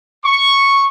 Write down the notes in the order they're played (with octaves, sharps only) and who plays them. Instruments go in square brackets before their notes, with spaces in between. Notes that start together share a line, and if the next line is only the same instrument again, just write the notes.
[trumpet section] C#6